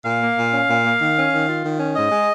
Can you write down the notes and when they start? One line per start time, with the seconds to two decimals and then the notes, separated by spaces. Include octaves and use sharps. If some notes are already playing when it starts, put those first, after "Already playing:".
0.04 A#2 F5
0.21 A#3
0.36 A#2
0.52 C#4
0.68 A#2
0.84 A#3
1.00 D#3
1.16 C#4
1.32 D#3
1.48 F4
1.63 D#3
1.79 C#4
1.95 G#2 D#5
2.11 G#3